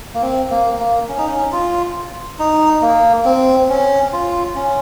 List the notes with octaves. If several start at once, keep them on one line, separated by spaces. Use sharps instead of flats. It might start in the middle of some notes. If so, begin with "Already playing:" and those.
A#3
C4
A#3
A#3
C#4
D#4
C#4
F4
D#4
A#3
C4
C#4
F4
C#4